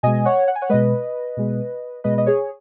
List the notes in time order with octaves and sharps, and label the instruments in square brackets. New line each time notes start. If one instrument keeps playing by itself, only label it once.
[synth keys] B2 G#3 D#5 G#5
C#5 F#5
F#5
G#5
C#5 F#5
B2 G#3 B4 D#5
B2 G#3
B2 G#3 B4 D#5
D#5
G#4 C#5